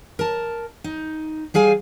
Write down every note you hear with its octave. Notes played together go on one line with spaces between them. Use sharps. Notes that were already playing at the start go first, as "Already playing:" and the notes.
A#4 A5
D#4
G3 G#4 F5 G#5